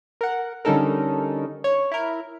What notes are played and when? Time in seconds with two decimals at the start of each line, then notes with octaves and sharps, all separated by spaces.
0.21 A#4 F#5
0.65 D3 G3 C#4 D#4 A4 A#4
1.64 C#5
1.91 E4 A#4